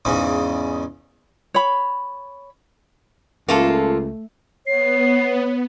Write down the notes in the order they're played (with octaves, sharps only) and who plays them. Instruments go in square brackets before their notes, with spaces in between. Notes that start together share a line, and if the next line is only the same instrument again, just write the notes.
[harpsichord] E2 G#2 C#3
[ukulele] C#5 B5
[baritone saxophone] C#2 [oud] A3 [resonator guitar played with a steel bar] A#3 F4 A4
[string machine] B3 [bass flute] C#5 [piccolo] C7